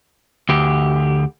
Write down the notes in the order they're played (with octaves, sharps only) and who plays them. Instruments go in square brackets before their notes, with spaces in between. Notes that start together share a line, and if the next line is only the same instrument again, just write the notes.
[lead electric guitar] D2 G4